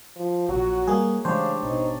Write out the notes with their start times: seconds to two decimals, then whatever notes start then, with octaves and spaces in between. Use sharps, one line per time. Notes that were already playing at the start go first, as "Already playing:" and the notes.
0.16 F3
0.49 A#1 A#2 F#3 F#4
0.87 G3 A#3 G#4
1.25 C#3 E3 G#3 A3 D4 G4 C5 C#5
1.63 G#1 B2 D#4